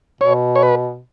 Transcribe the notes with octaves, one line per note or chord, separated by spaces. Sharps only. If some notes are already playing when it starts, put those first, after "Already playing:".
B2 C#5
C#5
B4